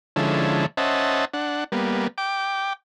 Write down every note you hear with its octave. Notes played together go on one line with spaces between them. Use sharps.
D3 F3 G#3 C#4 E4 A4
C#4 C5 D#5 E5 F#5 A5
D4 F#5
G3 A#3 B3
G5 D6